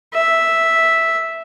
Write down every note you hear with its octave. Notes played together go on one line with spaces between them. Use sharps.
E5